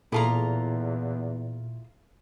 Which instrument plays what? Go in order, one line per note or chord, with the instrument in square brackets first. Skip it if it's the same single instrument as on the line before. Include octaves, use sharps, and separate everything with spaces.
[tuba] E2 [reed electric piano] A#2 [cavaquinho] E4 F4 A#5 [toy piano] G#4 A4 A5